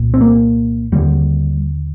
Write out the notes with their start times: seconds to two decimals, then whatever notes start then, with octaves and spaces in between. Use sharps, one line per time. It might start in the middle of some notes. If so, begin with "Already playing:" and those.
Already playing: C2 A#2
0.14 C4
0.21 A#3
0.92 D#2 D3 G3